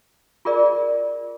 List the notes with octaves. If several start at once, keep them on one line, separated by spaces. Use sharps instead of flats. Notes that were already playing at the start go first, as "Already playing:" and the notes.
F4 G#4 A#4 D5